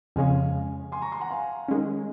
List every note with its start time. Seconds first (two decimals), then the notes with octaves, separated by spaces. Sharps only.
0.16 F2 C#3 G#3 C#4 F5 G#5
0.92 G#5 C6
1.02 A#5 C#6
1.12 G#5 C6
1.21 F#5 A#5
1.31 F5 G#5
1.68 D#3 G#3 C#4